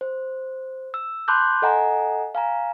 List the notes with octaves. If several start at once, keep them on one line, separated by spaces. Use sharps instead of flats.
C5
E6
A5 B5 C6 D6 F#6 G6
A4 D#5 F#5 G#5 A#5
F5 G#5 A#5